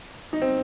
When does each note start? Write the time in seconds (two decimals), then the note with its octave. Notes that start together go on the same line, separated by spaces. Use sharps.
0.33 D#4
0.42 C4